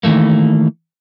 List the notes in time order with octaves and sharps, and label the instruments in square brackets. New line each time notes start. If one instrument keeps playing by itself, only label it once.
[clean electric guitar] D#3 E3 A3 A#3